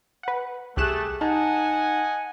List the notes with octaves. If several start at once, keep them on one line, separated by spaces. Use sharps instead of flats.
B4 F#5
C2 A3 G4 G#4 F#6 E7
D#4 D#5 F#5 G#5 A5